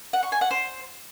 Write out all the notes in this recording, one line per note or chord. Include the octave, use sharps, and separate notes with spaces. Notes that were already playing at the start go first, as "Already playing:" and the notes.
F#5
C#6
G#5
F#5
C5